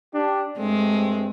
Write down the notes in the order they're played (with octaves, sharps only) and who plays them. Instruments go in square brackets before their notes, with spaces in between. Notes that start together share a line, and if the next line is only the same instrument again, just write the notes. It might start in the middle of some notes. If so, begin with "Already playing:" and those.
[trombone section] D4 G4
[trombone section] G2 A3 C4 [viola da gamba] G#3